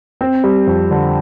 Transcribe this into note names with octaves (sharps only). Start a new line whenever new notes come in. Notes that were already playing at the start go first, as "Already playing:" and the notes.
C4
G3
F2
D3